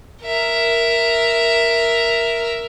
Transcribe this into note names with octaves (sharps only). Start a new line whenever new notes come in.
A#4 E5